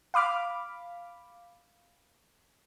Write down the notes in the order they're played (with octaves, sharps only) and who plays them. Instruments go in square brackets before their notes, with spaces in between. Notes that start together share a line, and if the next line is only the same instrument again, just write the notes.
[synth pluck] F5 B5 D6 F6